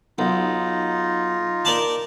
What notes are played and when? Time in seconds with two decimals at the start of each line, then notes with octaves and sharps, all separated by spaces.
0.18 B1 D#4 F4
1.65 A#4 D5 A5